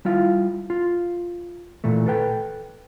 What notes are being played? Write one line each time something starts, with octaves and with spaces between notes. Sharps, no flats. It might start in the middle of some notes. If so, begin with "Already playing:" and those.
G3 E4 F4 F5
F4
A#2 E3 A3
A4 B4 G5